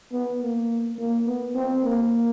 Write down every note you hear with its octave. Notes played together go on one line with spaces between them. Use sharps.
B3
A#3
A#3
B3
C4
A#3